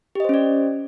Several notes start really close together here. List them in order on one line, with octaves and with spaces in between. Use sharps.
G4 D#5 C5 C#4 D5